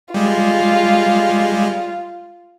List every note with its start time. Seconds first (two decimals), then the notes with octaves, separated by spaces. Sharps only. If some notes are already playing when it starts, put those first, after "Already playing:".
0.14 G3 G#3 F4